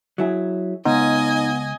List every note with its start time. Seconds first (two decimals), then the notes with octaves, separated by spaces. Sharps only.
0.18 F#3 E4 G#4
0.85 C#2 B3 D#4 D#5 G#5